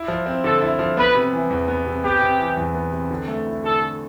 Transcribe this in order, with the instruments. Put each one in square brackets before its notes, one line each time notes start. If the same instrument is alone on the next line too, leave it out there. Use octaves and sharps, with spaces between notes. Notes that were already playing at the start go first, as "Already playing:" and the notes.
Already playing: [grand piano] E4
F3
C4
[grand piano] D3 [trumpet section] A4
[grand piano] E4
F3
[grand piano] B3 [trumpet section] B4
[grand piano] C3
E3
E2
B3
C3
[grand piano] B3 [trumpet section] G4
[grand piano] C3
E3
E2
B3
C3
D3
A3
E4
[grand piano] D3 [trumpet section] A4
[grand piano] D3